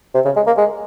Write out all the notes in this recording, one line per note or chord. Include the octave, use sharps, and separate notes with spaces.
C3
C#3
G#3
A#3
G#3